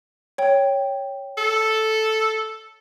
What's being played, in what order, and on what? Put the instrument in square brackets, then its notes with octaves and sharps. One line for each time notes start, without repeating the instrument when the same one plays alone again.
[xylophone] C#5 G5
[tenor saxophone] A4